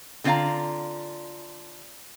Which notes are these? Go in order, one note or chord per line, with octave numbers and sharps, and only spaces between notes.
D3 C4 F4 D5 F5 A#5